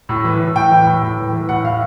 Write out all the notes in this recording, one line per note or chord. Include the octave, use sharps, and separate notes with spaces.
A2
E3
A2
A2 G5
E3
A2
A2
E3
E3
A2 F#5
A2 F5